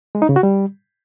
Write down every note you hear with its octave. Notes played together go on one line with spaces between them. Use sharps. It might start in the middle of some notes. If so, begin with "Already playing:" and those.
G#3
D#4
C#3
F#4
G3